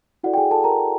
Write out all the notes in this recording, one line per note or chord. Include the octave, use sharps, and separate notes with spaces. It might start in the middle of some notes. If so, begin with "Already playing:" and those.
E4 F#4 A4 D5 F#5
G5
G#4 G#5
A4 A5
A#4 A#5